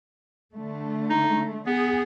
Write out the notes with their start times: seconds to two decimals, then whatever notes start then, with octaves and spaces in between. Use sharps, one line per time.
0.54 D3 A3
1.10 D#4
1.67 B3 G#4